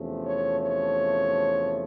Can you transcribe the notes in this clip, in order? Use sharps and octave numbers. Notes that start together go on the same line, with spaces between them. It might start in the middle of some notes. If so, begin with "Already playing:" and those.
Already playing: E2 C3 F3 A3 C#4
C#5
C#5